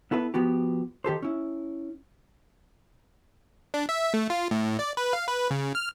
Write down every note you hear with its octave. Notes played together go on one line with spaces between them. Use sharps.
B3 E4 A4 B4
F3 B3 F#4 G4
D#3 G4 A4 C5
C#4 E4
D4
E5
A3
F4
A2
D5
B4
F5
B4
C#3
F6